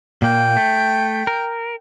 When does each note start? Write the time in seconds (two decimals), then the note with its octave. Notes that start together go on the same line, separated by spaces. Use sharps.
0.22 A#2 A#3 G5
0.56 A3
1.27 A#4